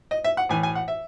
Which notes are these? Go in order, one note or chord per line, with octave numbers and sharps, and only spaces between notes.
D#5
E5
F#5
A2 E3 G#5
G#5
F#5
E5